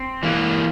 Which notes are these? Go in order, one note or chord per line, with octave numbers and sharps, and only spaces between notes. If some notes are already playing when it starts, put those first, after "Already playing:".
Already playing: C4
E3 A#3